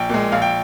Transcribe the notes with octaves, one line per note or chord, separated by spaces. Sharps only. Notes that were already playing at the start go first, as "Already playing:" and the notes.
Already playing: A#1 G5
A#2 G#3
A#1 F5
G5